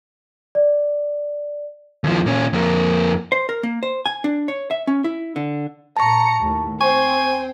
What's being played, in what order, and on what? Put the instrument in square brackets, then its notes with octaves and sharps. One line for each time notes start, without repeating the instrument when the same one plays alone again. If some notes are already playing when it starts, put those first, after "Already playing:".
[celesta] D5
[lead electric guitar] D#2 F3
A#2 C#4
F2 A#3
[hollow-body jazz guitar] C5
A#4
A#3
C5
G#5
D4
C#5
E5
C#4
E4
D3
[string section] A#2 A#5 C#7 [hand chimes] A5 C#6
[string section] D#2 A2
[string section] C4 C5 G5 [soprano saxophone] G#5 [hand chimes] C#6